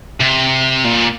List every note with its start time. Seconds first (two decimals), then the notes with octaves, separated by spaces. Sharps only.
0.20 C3
0.84 A#2